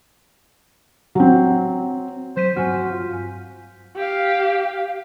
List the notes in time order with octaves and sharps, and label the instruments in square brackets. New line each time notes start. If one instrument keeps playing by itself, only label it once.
[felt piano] F#3 C4
[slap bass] F#3 [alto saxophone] C5 [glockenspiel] G6 B6 D#7
[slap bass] G2 F#3 C4 [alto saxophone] F#4 [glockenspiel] G#5 C6 F6
[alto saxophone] F4
[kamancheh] G4 F5